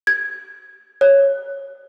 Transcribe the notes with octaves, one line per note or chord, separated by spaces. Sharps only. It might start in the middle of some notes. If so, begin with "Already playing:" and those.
G#6
C#5